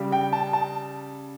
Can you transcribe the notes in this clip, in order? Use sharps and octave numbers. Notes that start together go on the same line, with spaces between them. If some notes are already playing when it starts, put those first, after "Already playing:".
Already playing: C#3 G3
G5
A5
A5